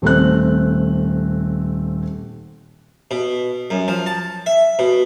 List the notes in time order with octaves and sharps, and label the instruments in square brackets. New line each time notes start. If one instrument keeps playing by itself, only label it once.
[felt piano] D#1 A3 C4 F#6
[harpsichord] B2
F#2
F3
A5
E5
B2